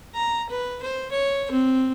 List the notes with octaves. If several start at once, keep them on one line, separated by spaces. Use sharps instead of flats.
A#5
B4
C5
C#5
C4